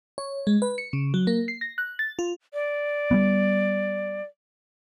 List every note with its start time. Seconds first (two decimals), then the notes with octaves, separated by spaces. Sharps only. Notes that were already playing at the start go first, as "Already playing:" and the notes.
0.18 C#5
0.47 G#3
0.62 B4
0.78 C#7
0.93 C#3
1.14 F#3
1.27 A#3
1.48 C7
1.61 A#6
1.78 F#6
1.99 A6
2.19 F4
2.54 D5
3.11 G3 A3 B3